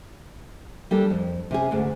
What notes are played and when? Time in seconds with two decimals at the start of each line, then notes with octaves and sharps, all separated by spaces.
0.91 G3 A#3 D4 A4
1.10 F2
1.51 C3 C#4 G#4
1.71 D2 G#2 A3